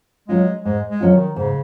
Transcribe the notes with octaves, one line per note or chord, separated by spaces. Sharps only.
F#3 G#3 C#4 F4
G#2 G#3
G#3
F#3 C#4 F4
D#3
G#2 C#3